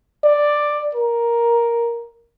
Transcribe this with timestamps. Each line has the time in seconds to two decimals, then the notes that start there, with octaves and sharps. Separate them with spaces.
0.24 D5
0.95 A#4